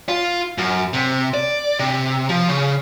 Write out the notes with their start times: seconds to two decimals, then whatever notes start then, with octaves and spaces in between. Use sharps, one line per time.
0.09 F4
0.58 F#2
0.93 C3
1.34 D5
1.79 C3
2.29 F3
2.48 C#3